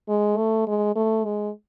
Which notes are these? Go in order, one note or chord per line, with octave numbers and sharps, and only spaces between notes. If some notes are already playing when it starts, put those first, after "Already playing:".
G#3
A3
G#3
A3
G#3